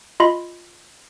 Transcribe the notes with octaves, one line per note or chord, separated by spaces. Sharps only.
F4 D#5 B5 C6